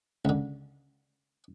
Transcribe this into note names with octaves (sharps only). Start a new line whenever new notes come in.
C#2 D3